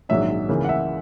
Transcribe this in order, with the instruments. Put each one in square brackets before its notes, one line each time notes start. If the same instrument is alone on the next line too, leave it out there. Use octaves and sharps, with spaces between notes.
[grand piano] A#1 G#2 D#3 F#3 C#4 E5
C#2 C#3 E3 A#3
F#5
E5